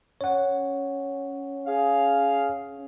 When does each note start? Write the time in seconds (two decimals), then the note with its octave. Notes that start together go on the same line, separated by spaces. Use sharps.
0.21 C#4 C#5 F#5
1.67 G#4 F5